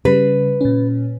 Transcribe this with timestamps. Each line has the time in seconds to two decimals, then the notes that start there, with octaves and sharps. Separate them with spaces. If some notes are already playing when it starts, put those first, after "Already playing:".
0.05 C#3 G3 B4
0.61 A#2 C#4